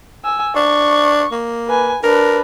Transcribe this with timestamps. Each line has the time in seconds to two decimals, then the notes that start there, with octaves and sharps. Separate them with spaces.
0.25 G#5 E6
0.56 D4 C#6
1.32 A#3
1.67 B4 G#5
2.03 D4 A#4 B4